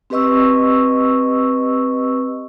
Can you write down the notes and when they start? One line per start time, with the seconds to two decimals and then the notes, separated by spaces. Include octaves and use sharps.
0.10 C4 G4 B4 D#5 C#6 E6